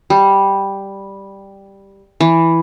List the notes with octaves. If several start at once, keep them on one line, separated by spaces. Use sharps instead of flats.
G3
E3